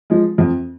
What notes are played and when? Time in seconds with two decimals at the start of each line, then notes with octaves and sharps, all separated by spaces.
0.10 F3 G#3
0.38 F2